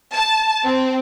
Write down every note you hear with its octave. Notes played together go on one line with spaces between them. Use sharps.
A5
C4